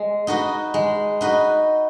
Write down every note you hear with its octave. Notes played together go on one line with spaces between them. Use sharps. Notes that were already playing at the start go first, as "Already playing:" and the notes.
Already playing: G#3
D#4 F#4 B4 D#5
G#3
D#4 F#4 B4 D#5